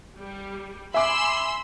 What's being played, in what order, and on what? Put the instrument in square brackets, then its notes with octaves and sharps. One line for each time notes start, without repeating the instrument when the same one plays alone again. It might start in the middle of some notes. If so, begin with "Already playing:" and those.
[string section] G3
[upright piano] E5 G#5 D6 [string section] B5 C6 E6